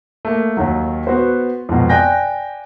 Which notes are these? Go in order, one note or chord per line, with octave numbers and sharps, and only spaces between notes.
A3 A#3
D#2 D#3 F#3
B3 F#4 B4 C5
F2 G#2 B2
D5 G5 G#5 F#6 G6 A#6